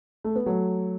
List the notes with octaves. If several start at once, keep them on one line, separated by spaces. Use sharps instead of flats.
A3
B3
F#3 A3